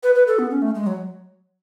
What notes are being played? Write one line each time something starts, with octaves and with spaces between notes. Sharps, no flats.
B4
B4
A4
B3
C#4
A3
G#3
F#3